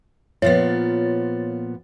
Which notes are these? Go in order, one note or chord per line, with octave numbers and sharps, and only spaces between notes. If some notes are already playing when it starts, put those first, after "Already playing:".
A#2 F3 B3 C#5 A6